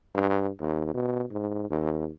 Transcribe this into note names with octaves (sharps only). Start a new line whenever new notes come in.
G2
D#2
B2
G#2
D#2